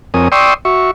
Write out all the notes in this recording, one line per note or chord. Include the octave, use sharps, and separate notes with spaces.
F2 C4 A#4 C#5 G#5 D#6
D5 G5 C6 C#6 D#6 E6
F#4 E5 C#6